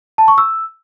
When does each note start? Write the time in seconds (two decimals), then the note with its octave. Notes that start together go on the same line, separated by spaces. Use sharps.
0.18 A5
0.28 C#6
0.38 E6